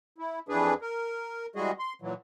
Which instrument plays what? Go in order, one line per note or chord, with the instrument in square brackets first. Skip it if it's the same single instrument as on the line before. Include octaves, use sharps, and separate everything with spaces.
[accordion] E4
F2 E3 D4 G#4 B4
A#4
E3 G3 G#3 F#4 G#4 D#5
C6
A#2 E3 F#3